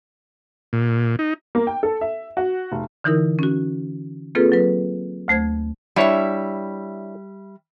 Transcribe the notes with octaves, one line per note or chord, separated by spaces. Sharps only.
A#2
D#4
A#3
G5
A4
E5
F#4
F1
D3 E3 D#4 E4 A#4
C#4 F#4
A#3 C4 F4 G#4 A4 B4
F#3 B4
D2 A3 C5 G#6
G3 D4 E4 C#5 E5